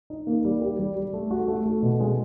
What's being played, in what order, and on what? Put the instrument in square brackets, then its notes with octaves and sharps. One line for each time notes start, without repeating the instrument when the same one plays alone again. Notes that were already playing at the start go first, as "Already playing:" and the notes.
[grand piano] D#4
A#3
G3
G4
G3
G3
A3
F#4
A3
A3
B2
G#3